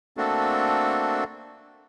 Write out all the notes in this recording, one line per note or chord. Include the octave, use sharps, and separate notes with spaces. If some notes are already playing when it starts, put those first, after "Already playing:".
A3 A#3 C4 D4 F#4 A4